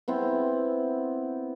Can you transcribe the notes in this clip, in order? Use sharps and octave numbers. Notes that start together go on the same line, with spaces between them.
B3 C4 E4